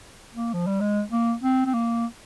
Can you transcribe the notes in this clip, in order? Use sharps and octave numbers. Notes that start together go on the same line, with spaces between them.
A#3
F3
G3
G#3
A#3
C4
C4
A#3